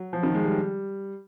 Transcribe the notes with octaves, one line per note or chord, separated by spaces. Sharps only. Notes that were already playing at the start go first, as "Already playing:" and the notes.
Already playing: F#3
F3
D#3
G#3
G3